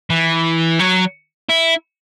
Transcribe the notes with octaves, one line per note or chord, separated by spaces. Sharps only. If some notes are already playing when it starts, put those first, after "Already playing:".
E3
F#3
E4